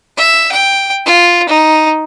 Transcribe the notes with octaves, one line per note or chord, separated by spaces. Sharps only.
E5
G5
F4
D#4